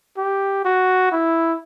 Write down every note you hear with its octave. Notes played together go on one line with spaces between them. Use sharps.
G4
F#4
E4